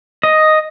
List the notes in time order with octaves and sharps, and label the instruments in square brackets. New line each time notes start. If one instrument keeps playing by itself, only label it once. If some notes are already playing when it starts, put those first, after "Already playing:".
[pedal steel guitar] D#5